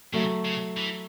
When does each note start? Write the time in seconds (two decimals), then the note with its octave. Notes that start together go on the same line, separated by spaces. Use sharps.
0.13 C#3 F#3 A3
0.45 C#3
0.77 E3